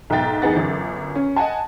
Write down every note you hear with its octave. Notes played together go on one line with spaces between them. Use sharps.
B1 G#2 E5 G5 A6
E2 D#4 G#4 B4 F#5 A6
G1 F#2
C#4
D#5 F#5 G#5 A5